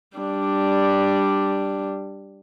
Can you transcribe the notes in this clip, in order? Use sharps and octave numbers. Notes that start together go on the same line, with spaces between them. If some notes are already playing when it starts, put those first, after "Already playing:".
G3 D4